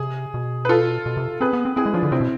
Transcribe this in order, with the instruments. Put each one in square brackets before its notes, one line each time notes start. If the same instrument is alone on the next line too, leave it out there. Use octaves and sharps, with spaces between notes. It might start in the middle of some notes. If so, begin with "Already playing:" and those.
Already playing: [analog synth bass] C3 [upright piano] G#4
[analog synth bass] B2
[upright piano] B4
F4 A4
[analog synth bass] B2
C3
[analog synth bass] C4 [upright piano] G#4 B4
[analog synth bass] B3
C4
[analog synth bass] C4 [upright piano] E4 G#4
[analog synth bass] G#3
[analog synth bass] F3 [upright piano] D4 F4
[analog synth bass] D3
[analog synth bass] C3 [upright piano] C4 E4
[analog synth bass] B2